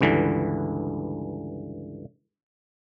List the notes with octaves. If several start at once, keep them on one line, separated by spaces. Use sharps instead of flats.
C#2 G2 D3 E3